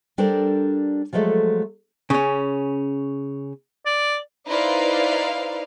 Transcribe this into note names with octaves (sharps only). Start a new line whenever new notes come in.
G3 D4 A4 A#4 C5 D5
F3 F#3 G#3 A3 A4
C#3 C#4
D5
D#4 E4 B4 C5 D5 F5